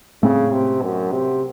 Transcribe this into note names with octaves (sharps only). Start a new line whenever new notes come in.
A2 C#3 A3 C4
C3
F#2
C3